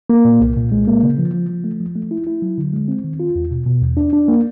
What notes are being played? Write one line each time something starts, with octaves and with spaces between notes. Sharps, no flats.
A#3
A#2
C2
A#2
G#3
A#3
C#3
F3
F3
F3
A3
F3
A3
E4
E4
F#3
D3
G#3
C4
D#3
F4
E2
B2
B2
E2
D4
D4
A#3